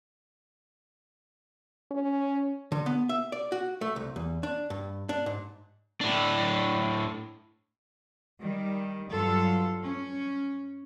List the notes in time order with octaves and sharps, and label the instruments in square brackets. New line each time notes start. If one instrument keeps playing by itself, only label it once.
[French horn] C#4
[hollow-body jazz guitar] D3
B3
E5
D5
F#4
A3
C2
E2
D4
G2
D4
G#2
[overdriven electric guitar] A2 D4
[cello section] D#3 G3
G2 F#3 F4 A4 F5
C#4